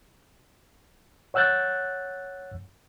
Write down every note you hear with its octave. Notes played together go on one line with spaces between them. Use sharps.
C#5 F#5 E6 F#6 G6 A6